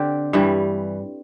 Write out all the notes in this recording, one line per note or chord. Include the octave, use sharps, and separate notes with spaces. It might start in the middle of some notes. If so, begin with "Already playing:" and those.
Already playing: D3 C4 G4
G2 E3 G3